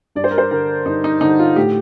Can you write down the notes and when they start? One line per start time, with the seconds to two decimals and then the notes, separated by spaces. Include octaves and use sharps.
0.15 G2 D5
0.24 C5
0.31 A#4
0.38 C5
0.51 D3 G3 A#4
0.86 G2 D#4
1.04 D#4
1.21 D3 G3 D#4
1.39 F4
1.56 A2 G4